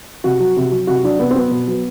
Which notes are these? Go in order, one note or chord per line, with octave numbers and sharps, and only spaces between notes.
C3 F#4
F#3
C3
F#3
C3 F#4
F#3 D4
C3 B3
C4
F#3 B3
B2
F#3